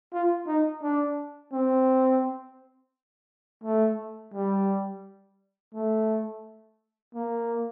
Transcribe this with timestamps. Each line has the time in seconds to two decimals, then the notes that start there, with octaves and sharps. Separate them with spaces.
0.13 F4
0.47 D#4
0.83 D4
1.53 C4
3.64 A3
4.34 G3
5.74 A3
7.15 A#3